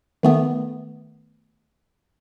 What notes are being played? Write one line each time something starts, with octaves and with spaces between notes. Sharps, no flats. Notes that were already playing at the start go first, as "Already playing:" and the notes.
D#3 A3 B3